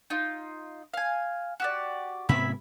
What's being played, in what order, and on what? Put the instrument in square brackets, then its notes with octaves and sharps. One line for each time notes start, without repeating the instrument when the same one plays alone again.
[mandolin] D#4 F4
F5 G#5
F#4 G4 D5
[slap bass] G#2 C3 B3 [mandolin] E4 E5 B5